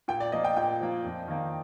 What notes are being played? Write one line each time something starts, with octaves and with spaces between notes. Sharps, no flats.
A#2 G5
D5
F3 A#3 D#5
G5
A#2 G5
F3 A#3
F2
D#3 A#3